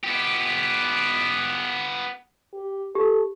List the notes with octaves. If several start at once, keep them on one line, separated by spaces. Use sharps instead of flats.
B3 G4
G4
G4 A4